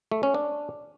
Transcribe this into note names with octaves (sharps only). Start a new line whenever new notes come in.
A3
C#4
D4